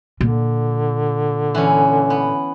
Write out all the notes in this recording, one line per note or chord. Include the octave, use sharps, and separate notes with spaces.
A#2 D3
E3 C#4
B3